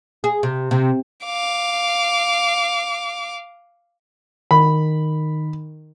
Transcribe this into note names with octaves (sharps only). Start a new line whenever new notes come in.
G#4
C3
C3
F5 D6
D#3 B5